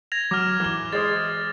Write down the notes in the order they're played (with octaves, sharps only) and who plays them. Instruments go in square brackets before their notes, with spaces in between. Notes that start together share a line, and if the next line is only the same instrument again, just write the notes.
[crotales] G#6 A#6 F7
[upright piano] F#3 [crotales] D6 F6
[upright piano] E3 G7
[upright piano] G#3 C5 [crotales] D#6 A6